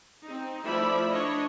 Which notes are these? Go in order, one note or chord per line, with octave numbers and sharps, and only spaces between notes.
C4 D#4
F3 A3 E4 D5 E5 B5
D4 C#5 D#5